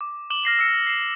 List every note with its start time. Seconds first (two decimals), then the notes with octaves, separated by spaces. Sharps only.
0.01 D6
0.30 D6 E7 F#7 G7
0.44 F6 A#6 C7 E7
0.59 E6 C#7
0.87 C7 E7